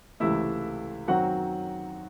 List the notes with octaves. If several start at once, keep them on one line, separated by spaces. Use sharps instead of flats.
C#2 C3 E3 A3 E4 E5
F#2 D#3 F#3 C4 F#4 F#5